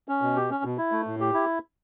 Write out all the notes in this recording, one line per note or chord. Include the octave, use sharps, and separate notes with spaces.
C#4
B2
G4
C#4
B2
E4
A3
A2
G4
E4